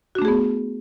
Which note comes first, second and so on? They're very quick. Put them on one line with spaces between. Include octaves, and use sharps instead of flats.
F#4 D4 A3 G#4 B3